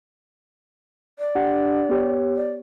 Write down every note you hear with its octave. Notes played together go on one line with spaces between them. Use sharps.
D5
D4 G4 F#5
B3 G4 C#5
D5